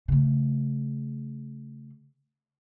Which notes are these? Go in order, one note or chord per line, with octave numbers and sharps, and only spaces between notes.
C#3 A3